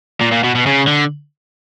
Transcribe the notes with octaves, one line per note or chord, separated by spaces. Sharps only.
A#2
A#2
B2
B2
C#3
D3